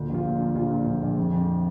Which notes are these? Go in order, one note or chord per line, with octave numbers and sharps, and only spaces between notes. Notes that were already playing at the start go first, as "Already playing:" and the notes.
Already playing: D2 A#2
A#1 F4
A#2
D4
A#2
A#1 F4
A#2
A#1
A#1
F2
F2